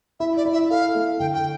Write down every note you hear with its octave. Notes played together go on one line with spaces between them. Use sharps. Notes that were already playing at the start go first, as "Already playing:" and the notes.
E4 E5
D5
E4
E5
A4 F5
A3
D3 G5
G5